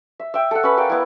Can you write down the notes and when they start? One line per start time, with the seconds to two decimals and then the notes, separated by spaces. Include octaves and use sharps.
0.20 E5
0.34 E5 G5
0.51 A4 F#5
0.63 C#4 B4 B5
0.77 A#4 D5 F5 G5
0.89 B3 E4